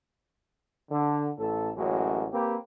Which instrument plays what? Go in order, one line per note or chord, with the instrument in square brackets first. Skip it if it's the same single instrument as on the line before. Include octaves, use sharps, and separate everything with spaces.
[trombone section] D3
A1 A2 A4
A1 F#2 G#3 F#4
A#3 C4 G4 B4